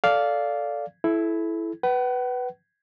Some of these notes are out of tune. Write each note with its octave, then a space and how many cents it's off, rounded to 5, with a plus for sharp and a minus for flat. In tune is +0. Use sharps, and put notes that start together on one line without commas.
A4 +0 D5 -15 F5 +0
E4 +5 A4 -30
B4 +0 F#5 +40